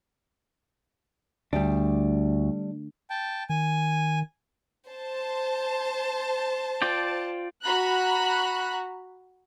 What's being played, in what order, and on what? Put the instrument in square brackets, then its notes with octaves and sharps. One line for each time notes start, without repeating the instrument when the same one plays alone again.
[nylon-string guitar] D2 [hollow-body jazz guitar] G3 D4
[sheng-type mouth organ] G5 A5
[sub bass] D#3 [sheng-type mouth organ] G#5
[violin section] C5 A5
[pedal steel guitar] F4 D5 G5
[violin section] F#4 A#5 B5 F#6